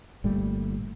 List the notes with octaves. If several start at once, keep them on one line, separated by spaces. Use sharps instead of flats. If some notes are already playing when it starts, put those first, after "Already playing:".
G1 A#2 G3 A3